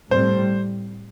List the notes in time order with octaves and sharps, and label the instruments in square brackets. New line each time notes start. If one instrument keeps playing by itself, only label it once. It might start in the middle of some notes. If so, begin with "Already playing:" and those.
[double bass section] A2 G3 C4 [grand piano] C5